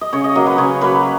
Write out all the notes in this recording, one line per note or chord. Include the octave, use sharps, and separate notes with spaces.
D#5
C#3 C#5
D#5
F#3 A#3 D#5
B4
C#3 C#5
F#3 A#3 B4